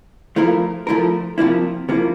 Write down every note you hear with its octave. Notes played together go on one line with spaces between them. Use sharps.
F3 A3 E4 A#4
F3 A3 E4 A#4
C3 F3 A#3 E4
C3 F3 A#3 E4